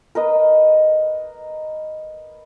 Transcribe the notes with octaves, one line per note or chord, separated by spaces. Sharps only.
A#4 B4 D#5